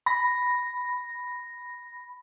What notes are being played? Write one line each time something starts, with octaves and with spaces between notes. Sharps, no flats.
B5 A#6